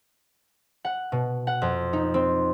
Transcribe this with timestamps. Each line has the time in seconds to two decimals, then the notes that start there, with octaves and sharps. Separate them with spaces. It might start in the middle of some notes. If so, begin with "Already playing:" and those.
0.85 F#5
1.12 B2
1.47 F#5
1.62 F2
1.93 D#4
2.14 C4